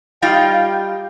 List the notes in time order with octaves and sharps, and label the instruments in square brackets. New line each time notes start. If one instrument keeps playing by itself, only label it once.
[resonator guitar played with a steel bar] G3 D#4 F4 [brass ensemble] F5 G5